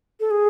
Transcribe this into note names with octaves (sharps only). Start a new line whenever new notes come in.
A4
G#4